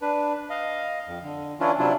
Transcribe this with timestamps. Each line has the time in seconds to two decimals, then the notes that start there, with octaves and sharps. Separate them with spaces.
0.02 D4 B4
0.50 D#5 F5
1.07 F2
1.23 D3
1.60 E3 C#4 D4 E4 F4
1.79 C3 F#3 D4 E4 F4